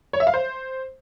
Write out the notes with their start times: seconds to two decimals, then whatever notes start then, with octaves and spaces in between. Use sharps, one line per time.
0.13 C#5
0.20 E5
0.27 F5
0.34 C5